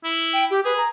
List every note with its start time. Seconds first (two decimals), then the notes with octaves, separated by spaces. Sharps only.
0.04 E4
0.33 G5
0.51 G4
0.65 G#4 B4
0.77 A#5